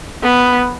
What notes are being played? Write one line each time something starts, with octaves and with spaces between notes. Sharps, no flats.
B3